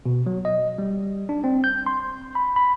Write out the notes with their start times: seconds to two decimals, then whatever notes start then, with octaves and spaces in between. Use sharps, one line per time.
0.06 B2
0.26 F#3
0.45 D#5
0.78 G3
1.29 D4
1.44 C4
1.64 G6
1.86 C6
2.35 B5
2.56 B5